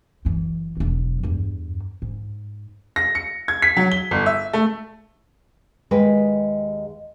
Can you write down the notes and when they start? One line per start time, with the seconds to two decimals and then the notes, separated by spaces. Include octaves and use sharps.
0.25 F#1 E3
0.77 E1 F#3
1.23 E2 G2
2.02 G#2
2.96 A#6
3.15 C#7
3.48 G#6
3.62 B6
3.77 F#3
3.92 G7
4.11 G1
4.26 E5
4.53 A3
5.91 D#2 G#3 G#4 B4 D#5 G5